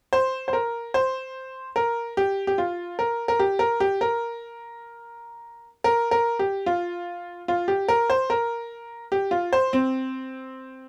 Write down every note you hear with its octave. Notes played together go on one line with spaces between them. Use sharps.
C5
C5
A#4
C5
A#4
G4
G4
F4
A#4
A#4
G4
A#4
G4
A#4
A#4
A#4
G4
F4
F4
G4
A#4
C5
A#4
G4
F4
C5
C4